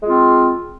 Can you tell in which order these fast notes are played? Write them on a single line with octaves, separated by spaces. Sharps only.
G#3 F4 C4